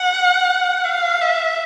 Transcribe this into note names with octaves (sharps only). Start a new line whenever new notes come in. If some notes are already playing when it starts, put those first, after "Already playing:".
Already playing: F#5
F5
E5